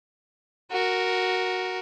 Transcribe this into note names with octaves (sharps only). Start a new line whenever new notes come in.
F#4 A#4